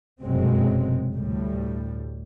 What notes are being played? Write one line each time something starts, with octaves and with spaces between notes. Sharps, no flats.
F1 F#2 B2 F#3 G#3 C4
D2 A2 G3